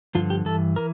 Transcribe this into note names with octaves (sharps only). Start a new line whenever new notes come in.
G2 D3 F3 F4
G4
G2 E3 A4
E3 A#4